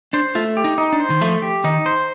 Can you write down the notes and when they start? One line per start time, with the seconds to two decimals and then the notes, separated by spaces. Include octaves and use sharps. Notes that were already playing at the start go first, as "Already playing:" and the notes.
0.13 D4 C5
0.35 A3 F4
0.57 G4
0.64 D#4
0.78 D#4
0.92 D4
1.00 C5
1.10 D#3
1.21 F3 A3
1.42 G4
1.64 D#3 D#4
1.86 C5